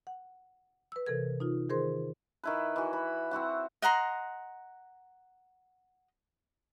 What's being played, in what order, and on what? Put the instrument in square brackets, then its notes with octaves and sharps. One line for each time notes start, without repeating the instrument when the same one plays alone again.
[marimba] F#5
B4 E6
C3 E3 A4 A#4 G#6
D#4 F4
D#3 G#4 A#4 C5 C6
[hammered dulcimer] D#3 E4 B4
E3 F#4
B5
C4 E4 F#4 F#5
[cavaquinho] D#5 F#5 A#5 C6